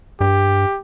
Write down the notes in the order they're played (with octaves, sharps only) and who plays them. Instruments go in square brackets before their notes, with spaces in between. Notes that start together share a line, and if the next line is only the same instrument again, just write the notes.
[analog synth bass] G2 [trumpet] G4